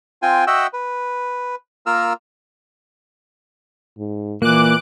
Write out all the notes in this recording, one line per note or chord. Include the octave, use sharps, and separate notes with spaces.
C4 F4 G5 G#5
F#4 D#5 E5 F#5 G5 E6
B4
A#3 F4 A#4 E6 F6
G#2
A#2 E3 A#3 D6 F#6